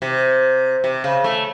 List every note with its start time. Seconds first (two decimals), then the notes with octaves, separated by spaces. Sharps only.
0.02 C3
0.84 C3
1.04 C#3
1.24 A3